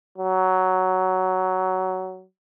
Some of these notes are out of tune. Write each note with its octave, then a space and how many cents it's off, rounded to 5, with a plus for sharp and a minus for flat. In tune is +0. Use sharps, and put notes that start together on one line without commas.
F#3 +10